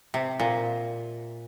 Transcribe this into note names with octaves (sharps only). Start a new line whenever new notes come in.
C3
A#2